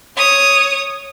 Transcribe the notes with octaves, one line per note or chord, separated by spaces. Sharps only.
C#5 D#6